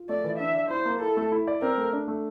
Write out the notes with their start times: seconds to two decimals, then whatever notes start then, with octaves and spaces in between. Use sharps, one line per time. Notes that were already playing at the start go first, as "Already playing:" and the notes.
Already playing: F4
0.09 A3 D5
0.24 E3
0.39 D4 E5
0.55 D5
0.70 E4 C5
0.86 A#3
1.01 E4 A4
1.17 A3
1.32 E4
1.47 D5
1.62 C4 A#4
1.77 A3
1.93 D4
2.08 A3